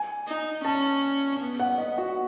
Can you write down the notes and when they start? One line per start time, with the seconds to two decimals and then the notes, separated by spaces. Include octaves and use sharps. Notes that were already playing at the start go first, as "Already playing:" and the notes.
Already playing: G#5
0.28 D#4
0.65 C#4 A5
1.41 B3
1.60 F#5
1.78 D#5
1.98 F#4